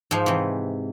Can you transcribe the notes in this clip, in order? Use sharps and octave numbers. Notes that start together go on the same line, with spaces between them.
G#2 F3
C3 E3